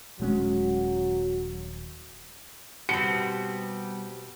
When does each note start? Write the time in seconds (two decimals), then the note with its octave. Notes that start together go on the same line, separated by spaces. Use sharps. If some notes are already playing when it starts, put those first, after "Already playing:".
0.20 D#1 F#3 G#3 C#4
2.89 B2 G3 B3 C4 G4 C#7